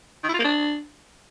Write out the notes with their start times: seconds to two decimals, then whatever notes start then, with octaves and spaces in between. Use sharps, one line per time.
0.24 D#3
0.29 E4
0.34 F4
0.39 A#3
0.44 D4